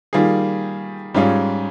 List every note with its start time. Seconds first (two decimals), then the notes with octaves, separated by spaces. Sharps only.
0.13 D#3 G3 A#3 F4 G#4
1.14 G#2 G3 C#4 F4 G#4